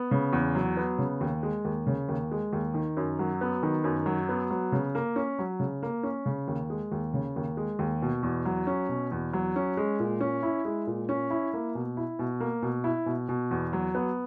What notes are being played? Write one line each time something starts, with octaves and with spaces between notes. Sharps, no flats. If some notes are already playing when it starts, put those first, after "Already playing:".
Already playing: B3
C#3
E2
F#3
B3
C#3
D#2
G#3
D#2
C#3
D#2
G#3
D#2
D#3
F#2
F#3
B3
D#3
F#2
F#3
B3
F#3
C#3
A#3
C#4
F#3
C#3
A#3
C#4
C#3
D#2
G#3
D#2
C#3
D#2
G#3
D#2
B2
E2
F#3
C#4
B2
E2
F#3
C#4
G#3
A#2
C#4
E4
G#3
A#2
C#4
E4
A#3
B2
E4
B2
A#3
B2
E4
B2
B2
E2
F#3
B3